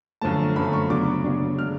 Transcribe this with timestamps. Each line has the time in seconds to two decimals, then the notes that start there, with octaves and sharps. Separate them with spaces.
0.21 F#2 D3 F3 A3 A5
0.56 F#2 D3 F3 A3 B5
0.73 C#6
0.90 C#3 F#3 B3 D4 D6
1.24 C#3 F#3 B3 D4
1.58 D3 G#3 D4 F6